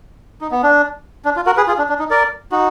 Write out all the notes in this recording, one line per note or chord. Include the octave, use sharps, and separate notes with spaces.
D#4
B3
D4
D4
F4
F#4 A#4
G#4 B4
F4 G#4
D4
D4
D#4
A#4 D5
D#4 F#4